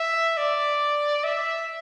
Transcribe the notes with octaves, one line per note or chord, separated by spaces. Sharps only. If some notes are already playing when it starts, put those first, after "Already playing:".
Already playing: E5
D5
E5